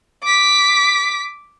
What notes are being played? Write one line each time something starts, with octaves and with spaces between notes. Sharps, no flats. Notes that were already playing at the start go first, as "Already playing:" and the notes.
D6 B6